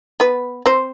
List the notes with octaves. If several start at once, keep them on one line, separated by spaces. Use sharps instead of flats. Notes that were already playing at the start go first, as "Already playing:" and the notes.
B3 B4
C4 C5